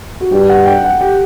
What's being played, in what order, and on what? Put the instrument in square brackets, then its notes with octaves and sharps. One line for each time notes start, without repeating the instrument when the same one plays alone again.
[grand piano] F#4
[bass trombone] G2 [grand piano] G4
[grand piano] F#5
G5
F#5
G4